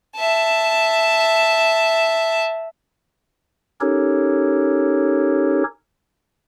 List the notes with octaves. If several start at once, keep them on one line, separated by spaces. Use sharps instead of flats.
E5 A5
C#4 D#4 G4 A4 A#4 C#5